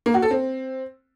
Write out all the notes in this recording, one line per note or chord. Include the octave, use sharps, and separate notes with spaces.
A#3
F#4
A4
C4